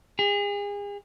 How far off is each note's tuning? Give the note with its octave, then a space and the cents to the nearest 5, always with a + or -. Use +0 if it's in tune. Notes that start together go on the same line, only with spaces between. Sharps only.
G#4 -35